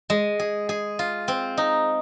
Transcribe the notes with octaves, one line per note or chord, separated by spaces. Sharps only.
G#3
G#4
G#4
F4
C4
D#4